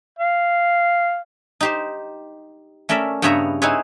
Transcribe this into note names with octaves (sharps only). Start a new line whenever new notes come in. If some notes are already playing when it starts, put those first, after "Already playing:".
F5
D#4 G4 C5
A3 C#4 A#4 D5 E5
G2 C#3 B3 C#5 E5 A#5
C4 D#4 E4 G#4 B4 C#5